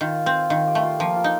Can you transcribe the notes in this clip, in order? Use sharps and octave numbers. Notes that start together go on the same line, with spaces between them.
D#3 F4
C4
D#3 F4
G4
A3
F4
F3 A#3
F4
D#4